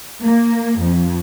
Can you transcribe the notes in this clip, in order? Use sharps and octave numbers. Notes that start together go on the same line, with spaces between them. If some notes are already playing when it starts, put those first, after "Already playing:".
A#3
F2